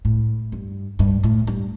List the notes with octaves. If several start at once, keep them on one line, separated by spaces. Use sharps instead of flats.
A2
G2
G2
A2
G2